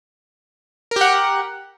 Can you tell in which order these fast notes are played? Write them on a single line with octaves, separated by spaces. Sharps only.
A#4 G4 F#5